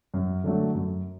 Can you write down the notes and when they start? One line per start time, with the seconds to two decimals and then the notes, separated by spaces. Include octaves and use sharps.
0.14 F#2
0.44 D3 F#3 A3
0.75 F#2